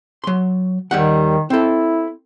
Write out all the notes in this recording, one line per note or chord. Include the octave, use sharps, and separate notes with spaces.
F#3 C6
D#2 D#3 G3 F#5
C4 E4 A4